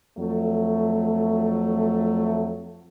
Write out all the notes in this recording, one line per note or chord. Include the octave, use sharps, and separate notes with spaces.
F2 F#3 A3